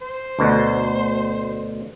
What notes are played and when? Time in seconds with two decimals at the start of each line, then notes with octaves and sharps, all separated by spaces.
0.01 C5
0.39 D2 B2 D3